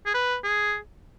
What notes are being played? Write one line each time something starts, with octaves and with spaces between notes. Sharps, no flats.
G#4
B4
G#4